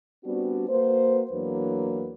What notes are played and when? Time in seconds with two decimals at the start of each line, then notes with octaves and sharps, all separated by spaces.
0.24 G3 B3 C4 D4 F#4
0.69 A#3 F#4 B4 C5
1.31 E2 E3 F#3 A#3 D4 B4